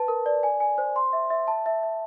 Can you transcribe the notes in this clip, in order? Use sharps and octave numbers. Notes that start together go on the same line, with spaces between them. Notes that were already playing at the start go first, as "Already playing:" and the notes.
Already playing: B4 A5
A#4
D5
G#5
G#5
C5
C6
E5
E5
A5
E5
E5